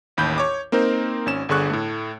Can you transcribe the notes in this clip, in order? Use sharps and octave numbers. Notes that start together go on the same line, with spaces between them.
A1 D#2 B5 G6
C#5 D6
A#3 C4 D#4 A#4 C5
G#1 C#4 E7
G1 D3 G#4 C#6 F#6
A2 A3